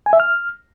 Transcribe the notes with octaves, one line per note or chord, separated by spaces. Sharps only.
G#5
E5
F6